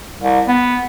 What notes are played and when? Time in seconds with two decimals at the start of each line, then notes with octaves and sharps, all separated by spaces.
0.22 C2
0.48 B3